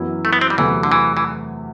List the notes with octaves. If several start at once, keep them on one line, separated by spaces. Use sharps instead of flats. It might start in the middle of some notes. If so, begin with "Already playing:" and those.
Already playing: F#2 E3 B3 E4
A3
B3
C4
G3
E2 C3 E3 F#3 A3 E4
D3
E3
E3